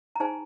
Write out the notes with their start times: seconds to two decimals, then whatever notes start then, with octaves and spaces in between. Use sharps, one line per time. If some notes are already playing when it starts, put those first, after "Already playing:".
0.16 A#5
0.20 D#4 G#4 C5 G#5